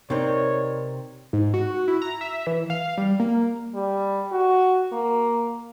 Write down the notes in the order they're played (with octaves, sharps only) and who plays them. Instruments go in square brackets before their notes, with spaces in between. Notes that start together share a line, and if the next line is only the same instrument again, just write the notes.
[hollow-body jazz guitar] C3 C4 [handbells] D#4 A#4 D5 [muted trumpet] C#5
[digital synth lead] G#2
F#4
E4
A#5
E5
E3
F5
G3
A#3
[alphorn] G3
F#4
A#3